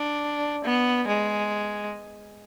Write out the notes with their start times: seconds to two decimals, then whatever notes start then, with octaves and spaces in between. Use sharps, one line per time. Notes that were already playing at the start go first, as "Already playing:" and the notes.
Already playing: D4
0.65 B3
1.08 G#3